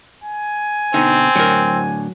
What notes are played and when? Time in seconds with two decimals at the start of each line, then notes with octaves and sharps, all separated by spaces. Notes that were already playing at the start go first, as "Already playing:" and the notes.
0.24 G#5
0.94 B2 D3 C4 D#4
1.36 A2 D3 F#3 A#4